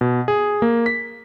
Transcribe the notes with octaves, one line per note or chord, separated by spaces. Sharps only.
B2
G#4
A#3
B6